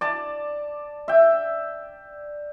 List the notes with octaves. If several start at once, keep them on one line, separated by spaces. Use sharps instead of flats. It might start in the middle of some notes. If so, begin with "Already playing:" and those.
D5 A5
E5 G5